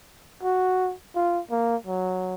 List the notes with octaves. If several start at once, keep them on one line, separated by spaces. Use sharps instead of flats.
F#4
F4
A#3
F#3